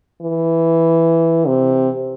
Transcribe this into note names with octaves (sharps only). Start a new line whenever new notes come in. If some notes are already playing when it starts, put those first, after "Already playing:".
E3
C3